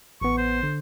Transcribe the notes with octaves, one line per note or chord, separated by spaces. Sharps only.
A1 B3 C#6
C5
D3